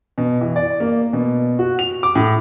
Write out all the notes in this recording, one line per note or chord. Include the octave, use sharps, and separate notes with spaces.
B2
E3
D5
A#3
B2
F#4
F7
D6
A2